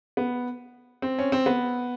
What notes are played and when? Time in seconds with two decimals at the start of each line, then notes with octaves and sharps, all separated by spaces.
0.17 B3
1.02 C4
1.19 C#4
1.32 C4
1.46 B3